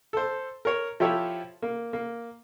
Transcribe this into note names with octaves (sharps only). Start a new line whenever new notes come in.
A4 C5
A#4 C#5
F3 E4 G4 A4 C#5 E5
A#3
A#3